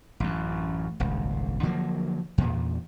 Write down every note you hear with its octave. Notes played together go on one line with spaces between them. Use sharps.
A1 F#2
D#1 G#1 C#2
D3 F3 F#3 A#3
E2 A#2